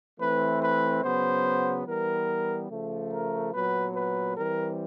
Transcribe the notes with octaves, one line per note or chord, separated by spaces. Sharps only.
E3 A3 C4 B4
B4
C#3 F#3 B3 C5
E3 G3 B3 A#4
C#3 F3 A3
A#4
A#2 F#3 B3 B4
B4
E3 G3 C4 A#4